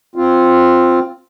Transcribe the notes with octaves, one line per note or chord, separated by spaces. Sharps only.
C4 F4